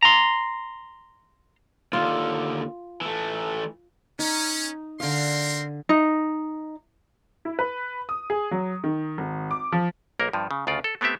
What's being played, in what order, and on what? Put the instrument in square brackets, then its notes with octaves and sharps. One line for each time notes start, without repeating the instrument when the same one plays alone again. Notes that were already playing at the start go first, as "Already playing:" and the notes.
[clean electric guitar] A#5 C6
[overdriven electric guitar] D#2 D3 [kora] F4
[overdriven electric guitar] E3 A3
[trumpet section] C#4 [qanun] D#4
[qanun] D3 F5 [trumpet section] C4 A#4 C6
[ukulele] D#4
[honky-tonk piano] E4
B4
D#6
G#4
F#3
D#3
G#1
D6
F3
[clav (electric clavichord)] B1 A#3 A#4
G2 F3
C#3
D2 C#3 F4 D5
A4
A3 B3 C4 G4 E5